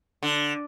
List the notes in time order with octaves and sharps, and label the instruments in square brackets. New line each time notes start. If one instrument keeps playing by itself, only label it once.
[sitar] D3